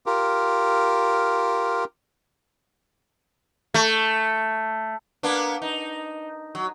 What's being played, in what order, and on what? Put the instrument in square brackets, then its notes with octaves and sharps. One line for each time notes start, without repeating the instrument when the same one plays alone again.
[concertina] F4 G4 A#4
[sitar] A3
A#3 B3 D4
D#4
F#3